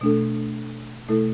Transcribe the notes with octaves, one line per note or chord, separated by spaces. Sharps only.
B2 A3 D4 A4
B2 A3 E4 A4